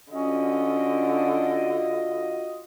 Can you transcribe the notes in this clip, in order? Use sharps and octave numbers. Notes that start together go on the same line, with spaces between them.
D3 C#4 F4 F#4 D#5